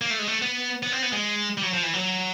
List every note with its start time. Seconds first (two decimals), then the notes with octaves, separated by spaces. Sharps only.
0.01 A#3
0.10 A3
0.19 G#3
0.28 A3
0.42 B3
0.83 B3
0.92 C4
1.02 B3
1.12 G#3
1.58 G3
1.63 F#3
1.73 F3
1.83 E3
1.94 F#3